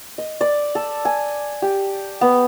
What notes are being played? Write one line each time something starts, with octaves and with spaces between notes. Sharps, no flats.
D#5
D5
A4
G#5
G4
B3